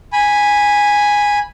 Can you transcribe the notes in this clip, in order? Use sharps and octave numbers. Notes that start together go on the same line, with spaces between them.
G#5 B5